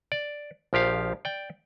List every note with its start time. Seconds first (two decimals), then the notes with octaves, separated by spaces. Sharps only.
0.12 D5
0.73 A#1 F3 G4 F5
1.25 D5 G5